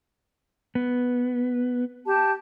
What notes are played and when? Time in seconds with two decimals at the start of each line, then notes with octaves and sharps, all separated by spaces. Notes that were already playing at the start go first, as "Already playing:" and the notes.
0.75 B3
2.06 G4 A5